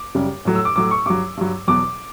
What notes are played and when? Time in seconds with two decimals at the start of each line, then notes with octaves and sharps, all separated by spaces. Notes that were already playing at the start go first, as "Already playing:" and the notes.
Already playing: D6
0.14 F#2 C#3 G3
0.45 A2 F#3
0.55 E6
0.65 D6
0.76 A2 F#3 D6
0.91 C#6
1.06 G2 F#3 D6
1.37 G2 F#3
1.67 E2 B2 F#3 D6